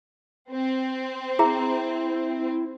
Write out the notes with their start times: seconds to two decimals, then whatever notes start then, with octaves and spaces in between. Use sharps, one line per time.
0.52 C4
1.39 E4 G#4 E5 A#5